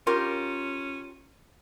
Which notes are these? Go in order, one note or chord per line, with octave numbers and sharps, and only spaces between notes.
C#4 F4 G4 A#4